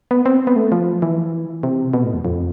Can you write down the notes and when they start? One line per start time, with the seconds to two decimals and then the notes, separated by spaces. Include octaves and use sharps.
0.11 B3
0.26 C4
0.47 B3
0.56 A3
0.72 F3
1.02 E3
1.63 C3
1.94 B2
2.04 A2
2.14 E2
2.25 F2